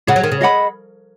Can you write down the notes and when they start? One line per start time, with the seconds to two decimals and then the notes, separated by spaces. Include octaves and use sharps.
0.07 C#3 G#4 C#5 F#5
0.16 F#3
0.24 D#3
0.32 C#3
0.41 G#4 D#5 F#5 B5